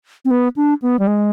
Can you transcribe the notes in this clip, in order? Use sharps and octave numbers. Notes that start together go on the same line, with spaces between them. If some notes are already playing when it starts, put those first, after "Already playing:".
C4
B3
D4
B3
G3
G#3